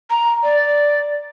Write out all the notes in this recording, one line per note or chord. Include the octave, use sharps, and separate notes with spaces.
A#5
D5